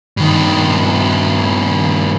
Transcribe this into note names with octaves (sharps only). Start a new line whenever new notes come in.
G2 D#3